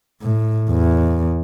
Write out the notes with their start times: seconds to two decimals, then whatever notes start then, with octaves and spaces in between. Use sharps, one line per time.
0.22 A2
0.71 E2